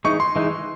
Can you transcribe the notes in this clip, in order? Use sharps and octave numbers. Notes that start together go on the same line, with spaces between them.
E3 G#3 D#4 C#6
C6
E3 G#3 D#4